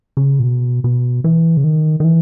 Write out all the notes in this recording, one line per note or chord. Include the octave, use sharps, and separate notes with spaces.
C#3
A#2
B2
B2
E3
C#3
D#3
D#3
E3